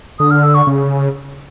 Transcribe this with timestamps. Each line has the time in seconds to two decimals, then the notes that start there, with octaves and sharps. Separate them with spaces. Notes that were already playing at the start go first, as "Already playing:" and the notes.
0.19 D3 D#6
0.31 F6
0.43 E6
0.55 C#6
0.67 C#3